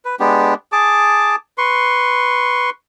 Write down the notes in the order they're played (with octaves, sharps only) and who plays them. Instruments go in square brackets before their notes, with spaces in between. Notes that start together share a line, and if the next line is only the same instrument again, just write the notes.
[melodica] B4
G#3 B3 D4 G4
G#4 A5 D6
B4 C6 C#6